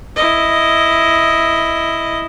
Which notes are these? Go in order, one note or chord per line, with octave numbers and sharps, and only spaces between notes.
E4 D#5